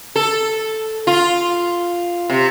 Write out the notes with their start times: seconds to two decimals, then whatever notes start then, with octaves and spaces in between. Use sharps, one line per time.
0.16 A4
1.07 F4
2.30 C3